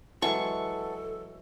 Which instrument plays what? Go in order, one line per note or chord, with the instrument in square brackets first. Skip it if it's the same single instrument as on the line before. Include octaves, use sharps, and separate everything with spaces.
[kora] E3 F#3 G#3 [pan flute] A4 [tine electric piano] B4 F#5 A5 [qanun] C#6